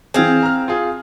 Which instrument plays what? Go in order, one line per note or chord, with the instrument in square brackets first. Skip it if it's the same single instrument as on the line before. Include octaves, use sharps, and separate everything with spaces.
[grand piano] E3 G#4 [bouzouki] C4 F5
[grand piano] A#5 F6
F4 G#4